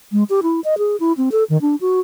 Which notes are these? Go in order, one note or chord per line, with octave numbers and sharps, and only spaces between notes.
G#3
G4
E4
D#5
G#4
E4
C4
A4
D#3
D4
F#4